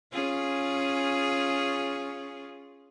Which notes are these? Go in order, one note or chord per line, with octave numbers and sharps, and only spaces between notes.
C#4 F4 G#4